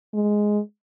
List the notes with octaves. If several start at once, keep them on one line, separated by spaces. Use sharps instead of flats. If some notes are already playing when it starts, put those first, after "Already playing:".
G#3